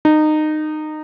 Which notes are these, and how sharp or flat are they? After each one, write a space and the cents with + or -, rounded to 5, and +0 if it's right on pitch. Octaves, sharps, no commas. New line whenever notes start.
D#4 -20